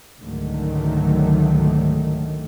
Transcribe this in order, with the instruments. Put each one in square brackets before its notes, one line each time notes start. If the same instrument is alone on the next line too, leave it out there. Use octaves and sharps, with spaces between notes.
[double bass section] C#2 G#2 D3 D#3 F#3 A3